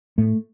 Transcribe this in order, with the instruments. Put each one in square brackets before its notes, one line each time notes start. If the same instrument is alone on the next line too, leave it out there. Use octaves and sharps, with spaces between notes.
[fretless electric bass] A2 A3